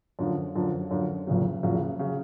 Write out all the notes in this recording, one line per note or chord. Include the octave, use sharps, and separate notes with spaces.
F#2 D3 F3
F#2 D3 F3
F#2 D3 F3
F#1 F2 C#3 F#3
F#1 F2 C#3 F#3
C#3 F#3